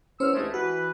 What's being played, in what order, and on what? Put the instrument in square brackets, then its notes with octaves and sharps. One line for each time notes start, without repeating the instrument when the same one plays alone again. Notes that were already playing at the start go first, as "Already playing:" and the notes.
[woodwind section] E2 E6 F6 [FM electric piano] C#4 C5 C#5
[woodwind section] C2 G#3 A3 [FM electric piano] D4
[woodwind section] E3 B4 [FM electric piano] F#4